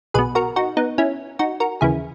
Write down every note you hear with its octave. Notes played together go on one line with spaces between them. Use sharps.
B1 B2 G#4 B4
F#4 A#4
D#4 F#4
B3 D#4
C#4 E4
D#4 F#4
F#4 A#4
D#2 C#3 E3 E4 G#4